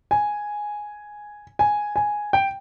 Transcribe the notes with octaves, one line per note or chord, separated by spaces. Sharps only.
G#5
G#5
G#5
G5